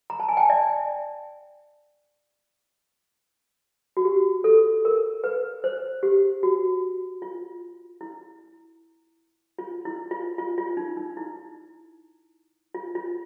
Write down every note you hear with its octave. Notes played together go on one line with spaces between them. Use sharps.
A#5
A5
G#5
G5 A5
D5 E5
F#4
G4
A4
A#4
B4
C5
G4
F#4
F4
E4
F4
E4
F4
F4
F4
D#4
D#4
E4
F4
F4